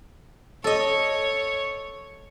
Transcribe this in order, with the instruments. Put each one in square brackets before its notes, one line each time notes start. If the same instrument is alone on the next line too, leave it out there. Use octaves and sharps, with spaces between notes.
[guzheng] A4 D#5 [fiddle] C#5